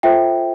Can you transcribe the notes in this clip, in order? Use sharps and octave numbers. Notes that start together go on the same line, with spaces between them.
F4 A4 C5 E5 G5